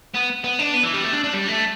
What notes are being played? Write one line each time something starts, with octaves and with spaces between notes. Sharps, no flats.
B3
B3
D4
B3
E3
G3
A3
D4
D4
G3
A3